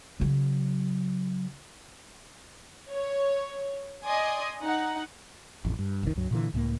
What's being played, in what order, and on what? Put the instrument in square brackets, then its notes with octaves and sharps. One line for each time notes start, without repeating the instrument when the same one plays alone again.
[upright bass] C#3 F#3
[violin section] C#5
D5 D#5 G#5 C6 D#6
D#4 F#5
[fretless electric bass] A1 F2
G2
F#1 C2 A2 D#3
C#2 G2 F#3
A#2 D3 E3
C#2 A2 A3 A#3